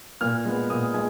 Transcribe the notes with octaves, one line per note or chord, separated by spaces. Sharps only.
A#2 F6
G#3 B3
A#2 D#6
G#3 G#5